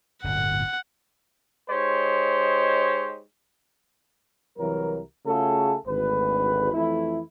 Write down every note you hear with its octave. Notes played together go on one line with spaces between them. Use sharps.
D1 G1 A#2 F#5
G#3 D#4 G4 C5 C#5
C2 E3 F#3 A#4
C#3 A3 F4 F#4 G#4 A4
G#1 D2 B4
F2 E3 A3 E4